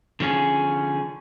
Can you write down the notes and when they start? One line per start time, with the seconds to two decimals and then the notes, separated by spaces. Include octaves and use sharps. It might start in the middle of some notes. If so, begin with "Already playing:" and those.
0.20 D3 F3 C#4 G#4